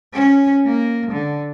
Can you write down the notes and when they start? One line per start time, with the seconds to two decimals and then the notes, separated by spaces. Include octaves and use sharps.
0.13 C#4
0.66 A#3
1.12 D3